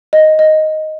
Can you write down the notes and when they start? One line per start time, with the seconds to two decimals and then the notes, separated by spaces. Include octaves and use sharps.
0.13 D#5
0.39 D#5